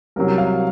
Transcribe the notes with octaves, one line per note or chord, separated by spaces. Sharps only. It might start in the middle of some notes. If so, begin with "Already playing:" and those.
C2 C3 F#3 A#4
F5